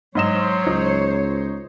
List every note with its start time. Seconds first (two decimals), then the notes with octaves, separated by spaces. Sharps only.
0.15 G#2 F#3 C5 C#5 D#5 E7
0.67 C#2 D#4